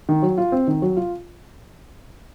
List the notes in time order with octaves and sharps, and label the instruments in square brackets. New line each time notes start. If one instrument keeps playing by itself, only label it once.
[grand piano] D#3
F#3
F4
C4
D#3
F#3
F4